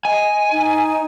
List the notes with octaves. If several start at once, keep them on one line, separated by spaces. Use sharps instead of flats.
D#5 G#5
D#4